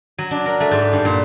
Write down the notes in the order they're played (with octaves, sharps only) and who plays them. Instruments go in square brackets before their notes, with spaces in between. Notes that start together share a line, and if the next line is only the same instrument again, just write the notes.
[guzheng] F#3
D4
A#4
A3
G#2
G2
A#2